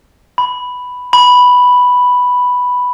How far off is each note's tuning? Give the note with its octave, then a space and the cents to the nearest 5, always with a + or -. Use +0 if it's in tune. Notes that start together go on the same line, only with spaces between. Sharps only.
B5 +5
B5 +0